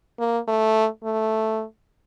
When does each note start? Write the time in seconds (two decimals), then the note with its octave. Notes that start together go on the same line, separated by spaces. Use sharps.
0.19 A#3
0.48 A3
1.04 A3